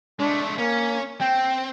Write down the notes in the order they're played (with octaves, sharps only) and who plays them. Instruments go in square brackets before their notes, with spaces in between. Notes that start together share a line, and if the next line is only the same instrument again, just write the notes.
[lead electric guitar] G#3 A3 [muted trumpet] D4
[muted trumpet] A#3 [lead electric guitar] C#4
[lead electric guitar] C4 [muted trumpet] G5